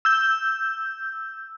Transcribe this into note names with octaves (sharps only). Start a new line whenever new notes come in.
E6 G6